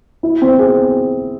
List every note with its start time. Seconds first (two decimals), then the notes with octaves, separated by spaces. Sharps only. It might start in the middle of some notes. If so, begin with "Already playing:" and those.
0.23 E4
0.42 C4
0.59 G#4